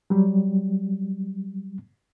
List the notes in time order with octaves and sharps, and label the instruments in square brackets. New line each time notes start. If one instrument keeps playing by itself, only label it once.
[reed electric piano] F#3 G3